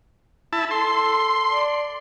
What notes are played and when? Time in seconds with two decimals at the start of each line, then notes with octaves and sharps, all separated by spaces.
0.53 E4 A5
0.71 A4 C6
1.51 D5